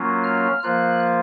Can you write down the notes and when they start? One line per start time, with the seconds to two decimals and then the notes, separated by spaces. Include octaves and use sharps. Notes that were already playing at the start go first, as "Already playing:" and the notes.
Already playing: F#3 A#3 C#4 F4
0.24 F6
0.63 F3 A#3 F4 F#6